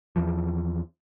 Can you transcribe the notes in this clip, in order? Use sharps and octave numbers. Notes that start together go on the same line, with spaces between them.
E2 E3 F3